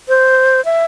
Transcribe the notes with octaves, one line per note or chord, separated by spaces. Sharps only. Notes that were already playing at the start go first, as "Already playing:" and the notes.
C5
E5